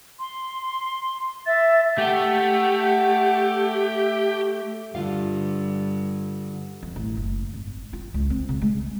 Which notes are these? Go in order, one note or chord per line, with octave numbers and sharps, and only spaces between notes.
C6
E5 A6
A3 G4 F#5
G2 D3 F4 F5
F2
A1
F#1
G#1
F4
C#2
C4
C#3
G#3